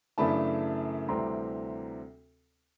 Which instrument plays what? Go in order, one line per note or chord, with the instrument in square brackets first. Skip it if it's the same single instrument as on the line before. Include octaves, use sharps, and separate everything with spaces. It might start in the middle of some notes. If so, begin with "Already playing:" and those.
[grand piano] F#2 C#3 E3 A3 D4 A5 B5
D2 C3 E3 G3 C4 A#5 C6